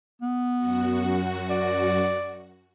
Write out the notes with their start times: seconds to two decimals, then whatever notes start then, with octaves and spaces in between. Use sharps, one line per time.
0.22 B3
0.58 F#2 F#4
1.50 D5